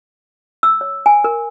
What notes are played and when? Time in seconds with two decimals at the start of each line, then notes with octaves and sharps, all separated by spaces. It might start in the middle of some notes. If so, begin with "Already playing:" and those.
0.63 E6
0.81 C#5
1.06 G#5
1.24 A#4